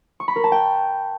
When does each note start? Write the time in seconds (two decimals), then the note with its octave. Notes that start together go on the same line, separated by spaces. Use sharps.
0.20 C#6
0.28 B5
0.36 A#4
0.44 A5
0.52 G5